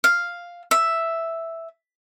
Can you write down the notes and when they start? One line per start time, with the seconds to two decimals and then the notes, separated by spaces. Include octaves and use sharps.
0.04 F5
0.71 E5